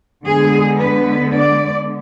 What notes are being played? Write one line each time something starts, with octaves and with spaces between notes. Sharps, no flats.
D3 G#3 B3 G#4
B4
D5